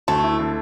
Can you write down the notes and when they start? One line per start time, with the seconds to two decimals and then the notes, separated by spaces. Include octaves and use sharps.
0.08 D2 A3 A4
0.23 E4
0.39 D3